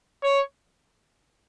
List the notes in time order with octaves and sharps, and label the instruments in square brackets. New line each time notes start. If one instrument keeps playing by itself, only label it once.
[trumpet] C#5